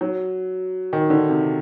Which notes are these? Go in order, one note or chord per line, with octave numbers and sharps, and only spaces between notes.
F#3
D#3
D3
C3